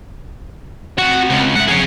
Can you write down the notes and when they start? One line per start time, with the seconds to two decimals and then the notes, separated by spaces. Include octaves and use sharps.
0.99 C4 F#4 F#5
1.30 C#2
1.56 G#2 E5 F#5
1.68 F2 F#3 G#4 C#5